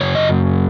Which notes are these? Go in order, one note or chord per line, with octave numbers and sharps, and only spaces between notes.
F#2 C#3 C#5
D#5